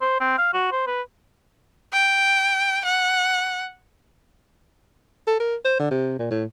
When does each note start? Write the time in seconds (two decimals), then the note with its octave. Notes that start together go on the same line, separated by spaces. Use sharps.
0.01 C5
0.20 C4
0.38 F5
0.53 F#4
0.72 C5
0.87 B4
1.93 G5
2.85 F#5
5.27 A4
5.40 A#4
5.64 C5
5.79 D3
5.91 C3
6.19 A#2
6.30 A2